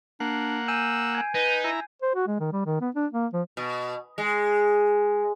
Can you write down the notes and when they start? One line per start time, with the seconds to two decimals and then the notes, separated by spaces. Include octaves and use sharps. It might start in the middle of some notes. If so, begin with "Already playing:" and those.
0.20 A#3 D4 F#5 C7
0.68 G#5 E6 G6 D#7
1.15 G#5 G#6
1.35 D#4 B4
1.64 E4 A#5
2.02 C5
2.15 F#4
2.27 G#3
2.40 D#3
2.53 G3
2.66 D#3
2.81 B3
2.95 D4
3.13 A#3
3.33 F3
3.57 B2
4.18 G#3